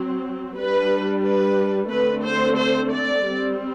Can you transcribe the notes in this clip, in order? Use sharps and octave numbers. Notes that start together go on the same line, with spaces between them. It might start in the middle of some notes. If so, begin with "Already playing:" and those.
Already playing: F#3 C4
G3 D4 B4
B4
D3 A3 C4 B4
C5
C5
D5
G3 C4